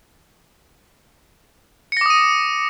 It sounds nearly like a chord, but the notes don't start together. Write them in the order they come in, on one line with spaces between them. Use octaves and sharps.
C#7 A#6 D6 D#6 D#7